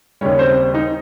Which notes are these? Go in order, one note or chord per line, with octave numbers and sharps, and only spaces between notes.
D#2 C#3 G3 C#4 C#5
C4 C5
D#4 D#5